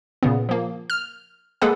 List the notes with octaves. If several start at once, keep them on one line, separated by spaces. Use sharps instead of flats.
A#2 C#3 B3
F3 A#3
F6
G#3 A#3 G#4 A4 B4 F#5